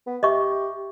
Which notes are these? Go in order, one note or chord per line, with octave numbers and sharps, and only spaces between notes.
B3
G4 D#5 E5 C#6